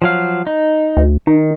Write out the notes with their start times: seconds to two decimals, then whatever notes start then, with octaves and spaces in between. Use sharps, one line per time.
0.02 F3 F#3 F5
0.47 D#4
0.97 D2
1.27 D#3 D#4